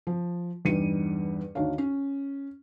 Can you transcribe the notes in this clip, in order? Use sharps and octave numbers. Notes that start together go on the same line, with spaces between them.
F3
E2 G2 G3 D#4 C#7 D#7
D2 D#3 D4 C#5 F5
C#4